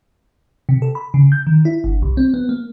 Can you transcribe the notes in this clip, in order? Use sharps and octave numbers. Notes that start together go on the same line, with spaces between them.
C3
A4
B5
C#3
G6
D#3
E4
G1
C2
C4
B3
A#3